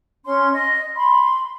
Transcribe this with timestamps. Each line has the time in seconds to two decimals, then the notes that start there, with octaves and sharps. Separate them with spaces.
0.24 C#4 C6
0.53 D#5
0.96 B5 C6